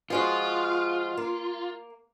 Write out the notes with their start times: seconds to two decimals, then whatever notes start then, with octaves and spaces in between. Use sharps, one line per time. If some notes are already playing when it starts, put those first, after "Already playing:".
0.10 F3 G#3 F4 F#4
1.17 A#3